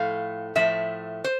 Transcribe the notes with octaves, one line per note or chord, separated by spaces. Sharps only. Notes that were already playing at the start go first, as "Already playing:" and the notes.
Already playing: A2 F3 A3 F5
A2 F3 A3 E5
C5